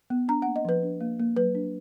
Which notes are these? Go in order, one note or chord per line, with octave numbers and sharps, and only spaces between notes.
B3
D4 A#5
A#3 F#5
D#5
F3 B4
D4
A#3
A#3
F#3 B4
D4